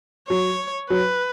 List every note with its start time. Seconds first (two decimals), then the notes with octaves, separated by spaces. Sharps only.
0.29 F#3 C#5
0.90 F#3 B4